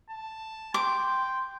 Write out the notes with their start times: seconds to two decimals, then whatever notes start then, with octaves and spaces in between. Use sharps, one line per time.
0.10 A5
0.74 G5 C6 D6